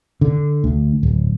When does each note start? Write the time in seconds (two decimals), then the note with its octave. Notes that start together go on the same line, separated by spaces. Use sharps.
0.21 D3
0.64 D2
1.03 D1